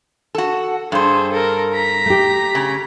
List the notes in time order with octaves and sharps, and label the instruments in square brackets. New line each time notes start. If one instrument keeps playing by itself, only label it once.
[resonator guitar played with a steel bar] F#4 A4
[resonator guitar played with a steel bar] G2 C5 [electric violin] G#4 A4
[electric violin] A4 A#4
A#5 B6
[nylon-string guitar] A3 G4
[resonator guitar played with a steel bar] C#3